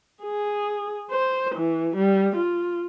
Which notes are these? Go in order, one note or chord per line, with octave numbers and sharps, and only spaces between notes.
G#4
C5
E3
G3
F4